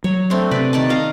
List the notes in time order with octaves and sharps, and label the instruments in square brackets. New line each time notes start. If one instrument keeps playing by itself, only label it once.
[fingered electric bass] F#3 [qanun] C#5
[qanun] A3 C4 D4
[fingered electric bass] C3 C4 [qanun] B4 D5
[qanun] D#3 D5 A5
D#5 F5 A#5